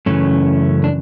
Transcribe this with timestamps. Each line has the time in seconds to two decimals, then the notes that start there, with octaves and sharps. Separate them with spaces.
0.06 F#2 C#3 E3 A3 C#4
0.84 D4